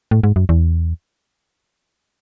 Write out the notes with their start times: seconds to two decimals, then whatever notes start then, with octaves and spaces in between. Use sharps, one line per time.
0.11 A2
0.23 G#2
0.36 F#2
0.49 E2